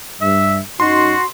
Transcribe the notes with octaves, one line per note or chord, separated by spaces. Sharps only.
G2 E5
F#2 F#3 D#4 F#4 C6